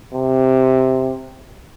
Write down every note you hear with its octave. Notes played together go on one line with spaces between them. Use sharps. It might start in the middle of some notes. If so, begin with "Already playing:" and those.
C3